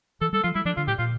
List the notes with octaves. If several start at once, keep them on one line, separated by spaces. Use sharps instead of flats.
E3 A4
G3 A4
F3 F4
G3 E4
F3 D4
D3 F4
A2 G4
A#2 F4